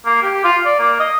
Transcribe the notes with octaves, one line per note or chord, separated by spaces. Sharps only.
A#3
G4
F4
D5
A#3
D#5